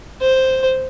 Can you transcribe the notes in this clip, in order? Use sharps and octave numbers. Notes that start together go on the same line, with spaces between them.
C5